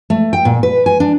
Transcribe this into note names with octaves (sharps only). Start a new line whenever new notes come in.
A3
G5
A#2
B4
G#5
D4